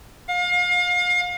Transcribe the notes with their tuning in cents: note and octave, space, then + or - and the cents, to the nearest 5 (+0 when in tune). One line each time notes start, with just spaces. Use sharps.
F5 +35